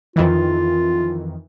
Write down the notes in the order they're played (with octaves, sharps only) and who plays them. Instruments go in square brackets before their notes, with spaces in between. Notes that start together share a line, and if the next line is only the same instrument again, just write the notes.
[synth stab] F2 D#3 E3 [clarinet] F4